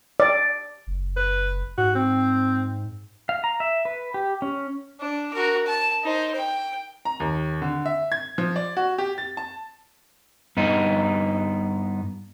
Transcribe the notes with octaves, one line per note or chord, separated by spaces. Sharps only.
D5
F#1
B4
G#2 F#4
C4
F5
A#5
E5
B4
G4
C#4
D4
F#4 A#4
A5
D#4 C5
G5
A#5
D#2
D3
E5
G#6
F3
D5
F#4
G4
A6
A5
G2 B3 D#4